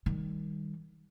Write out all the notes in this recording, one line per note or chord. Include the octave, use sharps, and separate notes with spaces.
D#3 G3